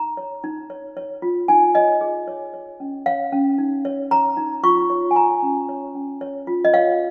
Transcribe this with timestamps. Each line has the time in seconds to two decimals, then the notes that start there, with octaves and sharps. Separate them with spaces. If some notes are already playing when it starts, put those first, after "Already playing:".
Already playing: D#4 A#5
0.17 C#5
0.44 D#4
0.70 C#5
0.97 C#5
1.22 F4
1.48 D#4 G#5
1.74 C#5 D#5
2.01 G#4
2.28 C#5
2.54 C#5
2.80 C#4
3.06 C#5 F5
3.32 C#4
3.58 D#4
3.85 C#5
4.11 C#5 A#5
4.37 D#4
4.63 F4 C#6
4.90 C#5
5.11 G#5
5.16 C#5 A#5
5.42 C#4
5.69 C#5
5.95 C#4
6.21 C#5
6.47 F4
6.65 D#5
6.73 C#5 F5